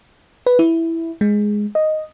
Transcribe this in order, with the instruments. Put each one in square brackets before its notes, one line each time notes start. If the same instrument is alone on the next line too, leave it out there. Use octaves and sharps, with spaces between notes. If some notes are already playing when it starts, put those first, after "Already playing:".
[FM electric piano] B4
E4
G#3
D#5